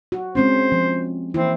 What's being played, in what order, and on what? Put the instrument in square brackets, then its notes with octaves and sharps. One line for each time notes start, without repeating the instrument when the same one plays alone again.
[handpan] F#4
[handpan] G#3 C4 C#4 [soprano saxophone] C5
[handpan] F3
[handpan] E3 A#3 E4 [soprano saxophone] C4